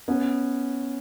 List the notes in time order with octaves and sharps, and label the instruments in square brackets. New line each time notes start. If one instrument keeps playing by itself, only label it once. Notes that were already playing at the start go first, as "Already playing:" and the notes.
[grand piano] B3 C#4